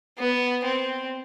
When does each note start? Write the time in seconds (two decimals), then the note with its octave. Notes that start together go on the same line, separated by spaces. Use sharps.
0.18 B3
0.64 C4